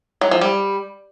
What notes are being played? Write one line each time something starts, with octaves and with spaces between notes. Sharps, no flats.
F#3
F3
G3